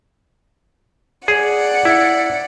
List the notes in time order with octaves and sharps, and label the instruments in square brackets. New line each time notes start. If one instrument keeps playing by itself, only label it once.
[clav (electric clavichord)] G#4 [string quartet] D5 F#5
[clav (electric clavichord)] E4